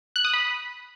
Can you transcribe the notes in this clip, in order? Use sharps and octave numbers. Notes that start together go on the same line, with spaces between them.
F#6
D#6
B5